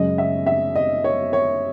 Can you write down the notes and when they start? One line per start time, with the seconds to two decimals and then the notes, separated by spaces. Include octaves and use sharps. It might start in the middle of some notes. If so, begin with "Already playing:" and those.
Already playing: F#2 C#3 G#3 C#4 D#5
0.18 E5
0.47 E5
0.75 D#5
1.04 C#5
1.33 C#5